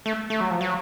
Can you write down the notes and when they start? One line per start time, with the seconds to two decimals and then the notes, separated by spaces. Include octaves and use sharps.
0.06 A3
0.30 A3
0.41 F#3
0.50 F3
0.61 F#3